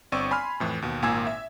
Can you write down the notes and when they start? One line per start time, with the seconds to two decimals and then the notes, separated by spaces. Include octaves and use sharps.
0.12 G1 C4 D5 C#6 E6 D#7
0.31 G#5 B5 C6 F6
0.60 F2 A2 E3
0.82 D#2 B2
1.02 G#1 A#2 A#3 G#5 E6 G#6
1.27 E5